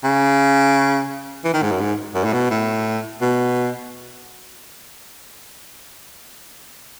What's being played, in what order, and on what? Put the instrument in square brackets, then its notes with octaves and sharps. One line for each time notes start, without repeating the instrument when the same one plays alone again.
[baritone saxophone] C#3
E3
D#3
G#2
F#2
G#2
F#2
A2
B2
A2
B2